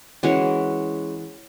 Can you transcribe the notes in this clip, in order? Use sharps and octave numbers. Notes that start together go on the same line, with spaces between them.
E3 G#3 C#4 F#4